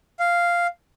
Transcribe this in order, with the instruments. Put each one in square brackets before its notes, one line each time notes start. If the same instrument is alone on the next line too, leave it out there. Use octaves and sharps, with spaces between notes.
[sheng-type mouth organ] F5